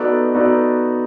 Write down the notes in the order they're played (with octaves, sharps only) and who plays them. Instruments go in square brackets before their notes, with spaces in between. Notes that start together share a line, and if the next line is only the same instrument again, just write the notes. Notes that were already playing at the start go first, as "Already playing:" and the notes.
Already playing: [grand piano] B3 D#4 F#4 A4 D5
B3 D#4 F#4 A4 D5